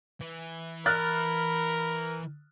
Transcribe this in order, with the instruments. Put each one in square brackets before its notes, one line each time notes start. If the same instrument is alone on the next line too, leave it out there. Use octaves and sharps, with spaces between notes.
[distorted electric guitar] E3
[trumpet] A#4 [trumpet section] B5 [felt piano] F6 F#6 A6